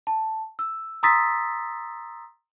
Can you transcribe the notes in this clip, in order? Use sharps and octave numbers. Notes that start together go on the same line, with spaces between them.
A5
E6
A#5 C6 D#6 E6 A6 B6